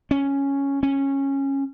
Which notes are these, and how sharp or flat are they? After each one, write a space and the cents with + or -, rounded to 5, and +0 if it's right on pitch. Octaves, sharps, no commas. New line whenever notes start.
C#4 +0
C#4 -15